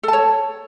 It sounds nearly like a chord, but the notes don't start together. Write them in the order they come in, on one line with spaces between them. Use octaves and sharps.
A4 A5 C#5